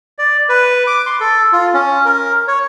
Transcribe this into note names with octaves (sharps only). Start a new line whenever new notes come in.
D5
B4
D6
C6
A4
F4
C#4
A#4
C#5